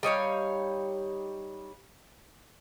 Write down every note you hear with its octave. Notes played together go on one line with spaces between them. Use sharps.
G3 D#4 C#5 F5